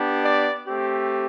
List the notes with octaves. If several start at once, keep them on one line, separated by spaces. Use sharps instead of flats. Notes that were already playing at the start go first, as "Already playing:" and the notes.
Already playing: B3 D4 G4
D5
A3 C4 G4